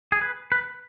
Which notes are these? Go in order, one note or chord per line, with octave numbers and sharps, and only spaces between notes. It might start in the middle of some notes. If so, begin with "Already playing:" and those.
G#4
B4
B4